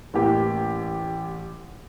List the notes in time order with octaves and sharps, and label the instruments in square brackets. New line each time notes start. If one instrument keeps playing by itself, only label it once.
[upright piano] A1 A#3 G4